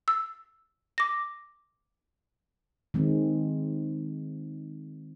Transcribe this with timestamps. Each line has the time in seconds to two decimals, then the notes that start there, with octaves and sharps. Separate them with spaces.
0.08 E6
0.98 D6 A#6
2.94 D#3 G#3 C4